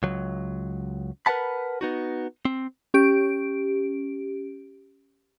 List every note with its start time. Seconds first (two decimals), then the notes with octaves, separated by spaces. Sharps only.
0.03 C#2 F#3
1.26 A#4 B4 C#5 F#5 A5 B5
1.81 B3 D#4 F#4
2.45 C4
2.94 C#4 G4 D7